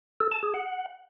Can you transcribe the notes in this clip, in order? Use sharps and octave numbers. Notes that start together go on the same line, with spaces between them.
A4
A5
G#4
F#5